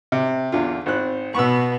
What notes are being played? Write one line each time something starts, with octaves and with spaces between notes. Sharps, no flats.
C3
E2 D3 F4
G#1 C4 F#6
B2 B3 C#6 E6